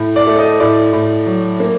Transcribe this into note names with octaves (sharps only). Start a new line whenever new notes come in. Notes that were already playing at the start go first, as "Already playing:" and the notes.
Already playing: A2
D5
A3
D#5
A2 D5
A2
F#3
A#3